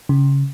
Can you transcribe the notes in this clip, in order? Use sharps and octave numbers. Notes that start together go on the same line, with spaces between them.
C#3